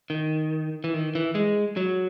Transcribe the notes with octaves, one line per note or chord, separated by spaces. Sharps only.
D#3
E3
D#3
E3
G#3
F#3